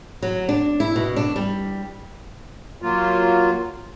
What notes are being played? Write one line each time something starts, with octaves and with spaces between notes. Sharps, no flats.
F#3
D4
E4
B2
D4
G3
F#3 A#3 F4